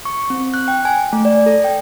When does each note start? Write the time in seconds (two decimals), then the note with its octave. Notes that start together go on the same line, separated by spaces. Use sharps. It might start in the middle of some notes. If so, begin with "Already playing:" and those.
0.05 C#6
0.30 C4
0.54 F#6
0.68 G5
0.85 G#5
1.13 A3
1.25 D5
1.46 A4
1.64 G5